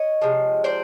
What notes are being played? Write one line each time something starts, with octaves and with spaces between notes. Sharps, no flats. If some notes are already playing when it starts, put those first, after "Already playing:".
Already playing: C#5 D#5
C3 F3 G#3
C5 D5